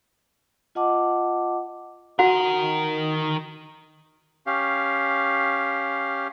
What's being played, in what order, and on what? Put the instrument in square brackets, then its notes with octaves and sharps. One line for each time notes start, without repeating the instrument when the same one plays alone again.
[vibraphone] F4 D#5 F#5 A5 D6
[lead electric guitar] D#3 A#4 [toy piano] F#4 F#5
[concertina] C#4 G4 F5